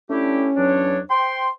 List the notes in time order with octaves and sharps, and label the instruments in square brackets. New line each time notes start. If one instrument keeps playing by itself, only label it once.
[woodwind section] A3 E4 G4 [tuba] C#4 [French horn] D4
[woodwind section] E2 F#3 D4 [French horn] C#5
[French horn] C5 [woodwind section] G5 C6